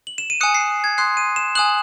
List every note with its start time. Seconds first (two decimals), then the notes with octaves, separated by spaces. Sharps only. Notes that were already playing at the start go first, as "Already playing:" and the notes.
0.07 F#7
0.18 E7
0.30 D#7
0.41 G#5 D#6 F#6 C#7
0.55 C7
0.84 G#6
0.98 C6 D#6 F#6 C7
1.17 D#7
1.36 E7
1.55 G#5 D#6 F#6 F#7